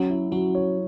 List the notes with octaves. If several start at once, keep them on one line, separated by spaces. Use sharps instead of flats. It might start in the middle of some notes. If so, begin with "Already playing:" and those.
Already playing: F#3 C#4 F#4
E4
F#3 C#4 F#4
C#5